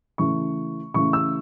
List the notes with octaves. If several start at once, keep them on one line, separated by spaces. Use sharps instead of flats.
C#3 E3 A3 C#6
C#3 E3 A3 C#6
E6